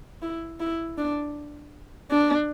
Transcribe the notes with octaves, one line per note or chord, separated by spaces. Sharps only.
E4
E4
D4
D4